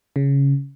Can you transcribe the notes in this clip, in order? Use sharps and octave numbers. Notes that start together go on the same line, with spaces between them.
C#3